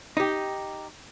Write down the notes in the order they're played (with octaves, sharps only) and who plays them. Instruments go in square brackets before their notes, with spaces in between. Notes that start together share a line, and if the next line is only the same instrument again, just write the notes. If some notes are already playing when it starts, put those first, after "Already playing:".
[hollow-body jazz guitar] D#4 G4